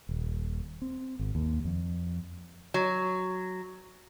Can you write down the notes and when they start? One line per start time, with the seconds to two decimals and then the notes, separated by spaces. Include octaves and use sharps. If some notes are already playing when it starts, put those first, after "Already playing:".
0.09 D#1
0.82 C4
1.19 G#1
1.35 D#2
1.65 F2
2.74 F#3